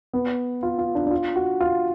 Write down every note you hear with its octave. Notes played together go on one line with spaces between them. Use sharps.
B3
F4
F4
D4
D4
F4
F#4
F4